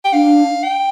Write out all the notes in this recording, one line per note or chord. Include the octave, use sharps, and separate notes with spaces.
G5
D4 F5
G5